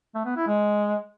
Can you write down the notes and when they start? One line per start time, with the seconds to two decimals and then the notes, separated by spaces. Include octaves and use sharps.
0.15 A3
0.26 B3
0.36 E4
0.47 G#3